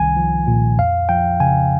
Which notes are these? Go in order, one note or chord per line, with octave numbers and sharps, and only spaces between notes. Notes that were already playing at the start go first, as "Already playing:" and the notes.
Already playing: C2 D#3 G#5
F3
A#2
F2 F5
F3 G5
C#3 G#5